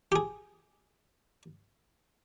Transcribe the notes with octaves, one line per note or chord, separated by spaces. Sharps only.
G4 G#4